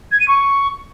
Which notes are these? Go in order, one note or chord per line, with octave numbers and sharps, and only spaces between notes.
G#6
D#7
C#6